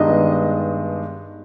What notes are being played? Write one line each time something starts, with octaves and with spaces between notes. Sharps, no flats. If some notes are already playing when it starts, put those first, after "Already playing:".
Already playing: G2 D#3 G#3 B3 D4 D#5